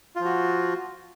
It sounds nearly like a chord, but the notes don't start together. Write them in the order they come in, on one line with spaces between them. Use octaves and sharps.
F4 F3 F#4